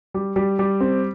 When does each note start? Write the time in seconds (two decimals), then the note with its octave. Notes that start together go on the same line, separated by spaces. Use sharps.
0.14 G3
0.36 G3
0.59 G3
0.81 C4